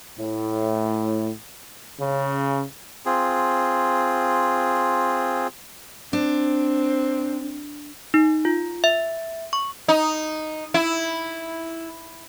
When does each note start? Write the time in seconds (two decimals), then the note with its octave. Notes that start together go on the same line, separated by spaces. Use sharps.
0.19 A2
2.00 C#3
3.06 C4 F4 G#4
6.13 C4 D4
8.14 D#4
8.45 F4
8.84 E5
9.53 C#6
9.88 D#4
10.74 E4